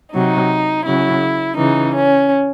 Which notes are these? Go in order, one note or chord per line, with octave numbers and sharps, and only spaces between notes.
C3 F#3 D#4
C#3 F#3 E4
C#3 E3 D#4
C#4